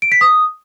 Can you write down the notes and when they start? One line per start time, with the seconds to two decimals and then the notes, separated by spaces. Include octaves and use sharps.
0.02 D7
0.12 B6
0.21 D#6